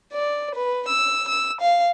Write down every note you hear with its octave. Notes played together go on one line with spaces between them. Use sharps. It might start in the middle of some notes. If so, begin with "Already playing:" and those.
D5
B4
E6
E6
F5